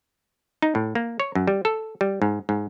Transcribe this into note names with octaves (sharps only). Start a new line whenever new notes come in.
D#4
A2
A#3
C#5
F#2
G3
A4
G3
G#2
G#2